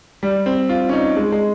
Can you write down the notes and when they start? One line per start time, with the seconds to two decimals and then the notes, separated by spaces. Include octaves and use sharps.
0.23 G3
0.46 C4
0.69 F4
0.89 C#4
0.93 D#4
1.16 G#3
1.32 G#3